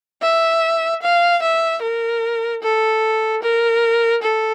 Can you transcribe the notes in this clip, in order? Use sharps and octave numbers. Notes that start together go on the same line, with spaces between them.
E5
F5
E5
A#4
A4
A#4
A4